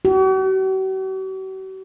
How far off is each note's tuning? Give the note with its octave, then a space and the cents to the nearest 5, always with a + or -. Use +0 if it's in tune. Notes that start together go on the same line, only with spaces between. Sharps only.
F#4 +45